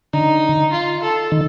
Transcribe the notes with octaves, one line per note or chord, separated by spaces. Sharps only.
D3 D#4
F4
A4
D#3